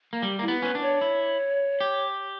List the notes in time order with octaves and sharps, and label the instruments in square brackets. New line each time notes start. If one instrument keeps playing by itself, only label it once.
[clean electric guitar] A#3
[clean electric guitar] G3 [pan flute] G4
[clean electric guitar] A#3 [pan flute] E4
[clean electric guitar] B3
[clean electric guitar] C#4 [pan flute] B4
[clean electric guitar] D4
[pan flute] C#5
[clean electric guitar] E4
G4